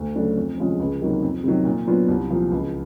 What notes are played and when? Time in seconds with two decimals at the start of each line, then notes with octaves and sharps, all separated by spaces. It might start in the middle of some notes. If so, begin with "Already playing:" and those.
Already playing: D2
0.15 C#3 F#3 A3 D4
0.37 F2
0.58 C3 F3 G#3 C#4
0.80 C#2
1.01 C3 D#3 F#3 A#3
1.22 F2
1.44 C3 D#3 F#3
1.65 A#2
1.87 F#3 B3 D4 F4
2.08 C2
2.30 A#2 F3 A#3
2.51 C#2